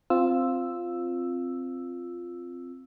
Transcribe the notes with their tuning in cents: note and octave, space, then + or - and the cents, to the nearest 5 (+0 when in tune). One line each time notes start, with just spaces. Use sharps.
C4 +0 F4 +0 E6 +0